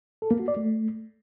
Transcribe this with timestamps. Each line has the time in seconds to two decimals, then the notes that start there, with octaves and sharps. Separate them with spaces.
0.22 A4
0.31 A#3
0.39 F#4
0.48 D5
0.57 A3